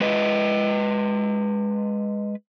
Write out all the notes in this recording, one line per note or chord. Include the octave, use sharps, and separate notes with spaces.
G#3 B4 D#5